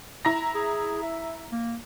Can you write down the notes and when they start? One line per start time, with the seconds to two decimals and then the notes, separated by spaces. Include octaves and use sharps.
0.25 E4 A#5 A#6
0.55 G#4
1.03 E5
1.52 A#3